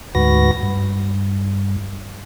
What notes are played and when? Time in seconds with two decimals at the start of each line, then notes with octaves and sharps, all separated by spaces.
0.15 D2 G#2 F#4 B4 A#6
0.63 G2